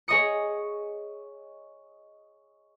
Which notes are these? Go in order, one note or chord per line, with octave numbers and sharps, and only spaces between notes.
G#4 C#5 D#5 C#6 D#6 C#7